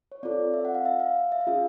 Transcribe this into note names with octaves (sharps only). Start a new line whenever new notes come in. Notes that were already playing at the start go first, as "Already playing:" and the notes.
C#5
C4 F4 A4 D5
E5
F#5
F5
E5
F5
F5
E5
F5
C#4 F4 G#4 E5